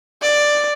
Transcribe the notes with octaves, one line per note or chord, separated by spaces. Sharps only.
D5